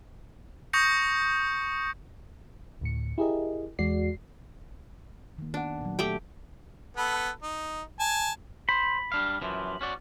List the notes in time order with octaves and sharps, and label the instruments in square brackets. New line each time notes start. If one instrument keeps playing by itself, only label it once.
[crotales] C#6 D#6 G6 A#6 C#7
[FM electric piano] D2 A2 C#7
E4 G4 G#4 A#4 D#5
E2 G#3 F#4 D5 C7
[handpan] D#3 A#3
[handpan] B3 F#5 [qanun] D4
[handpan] A#2 F#3
[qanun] A3 G4 G5
[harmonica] B3 A4 B4
D#4
G#5 A5
[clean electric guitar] C5 [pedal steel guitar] B5
[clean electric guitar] G3 D4 F5
F#2 E3 F3
C#4 F#4 D5